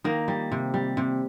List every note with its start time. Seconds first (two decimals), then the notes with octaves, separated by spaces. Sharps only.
0.04 D#3 A#3
0.28 G3
0.52 C3
0.74 G3
0.97 C3